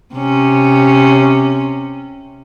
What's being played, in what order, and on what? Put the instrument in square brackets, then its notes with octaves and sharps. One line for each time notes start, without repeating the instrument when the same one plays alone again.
[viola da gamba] C3 C#4